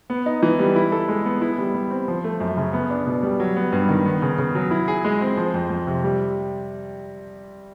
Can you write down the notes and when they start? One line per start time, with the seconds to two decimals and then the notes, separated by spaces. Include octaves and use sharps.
0.10 B3
0.26 D#4
0.43 E3
0.59 G3
0.76 E4
0.92 A4
1.08 G#3
1.25 B3
1.42 E4
1.58 G3
1.74 G3
1.91 C4
2.08 F3
2.24 A3
2.40 F#2
2.57 C#3
2.73 B3
2.90 D4
3.07 B2
3.23 G3
3.40 F#3
3.56 B3
3.73 G2
3.89 D#3
4.06 B3
4.22 C#3
4.38 C#3
4.55 F#3
4.71 E4
4.88 G#4
5.05 G#3
5.21 C4
5.37 F3
5.54 F2
5.70 F2
5.87 C3
6.03 G3